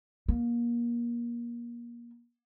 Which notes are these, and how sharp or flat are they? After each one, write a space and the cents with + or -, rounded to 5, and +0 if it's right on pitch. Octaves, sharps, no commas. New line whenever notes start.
A#3 +30